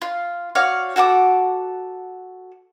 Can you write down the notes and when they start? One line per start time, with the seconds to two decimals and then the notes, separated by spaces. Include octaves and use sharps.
0.02 F4
0.55 F#4 C#5 D5 F5
0.96 F#4 A4 F#5 D6